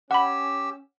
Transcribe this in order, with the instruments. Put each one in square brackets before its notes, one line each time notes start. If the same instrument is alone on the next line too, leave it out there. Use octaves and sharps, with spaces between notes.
[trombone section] C#4 [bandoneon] G4 E6 [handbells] F#5 B5